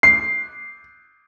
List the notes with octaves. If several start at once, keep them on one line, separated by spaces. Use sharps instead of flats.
C7